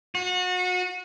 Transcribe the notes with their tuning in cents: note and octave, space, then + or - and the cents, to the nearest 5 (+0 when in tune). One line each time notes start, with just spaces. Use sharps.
F#4 -30